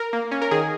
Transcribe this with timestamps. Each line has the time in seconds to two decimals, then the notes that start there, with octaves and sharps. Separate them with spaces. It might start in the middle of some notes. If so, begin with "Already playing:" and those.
Already playing: A#4
0.13 A#3
0.32 C#4
0.42 A#4
0.51 D#3 G#4